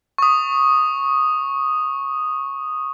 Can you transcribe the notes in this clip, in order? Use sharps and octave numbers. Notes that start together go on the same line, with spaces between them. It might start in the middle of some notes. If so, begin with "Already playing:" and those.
C#6 D#6